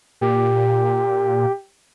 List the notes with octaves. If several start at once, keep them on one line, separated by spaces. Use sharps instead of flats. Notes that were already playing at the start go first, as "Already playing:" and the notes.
A#2 G4